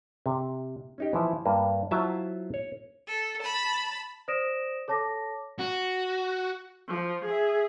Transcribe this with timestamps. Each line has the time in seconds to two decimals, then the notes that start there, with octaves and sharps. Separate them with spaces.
0.26 C3
0.98 C#4 D#4 G4
1.13 E3 F3 E4
1.45 G2 A#3
1.91 F#3 E4 F4 C5 E5 A5
2.54 C#5
3.07 A4
3.42 A5 B5
4.28 C5 D5 D#6 A#6 D7 E7
4.88 A4 C#5 A5 D6 A#6
5.59 F#4
6.88 F3
7.25 G#4 E5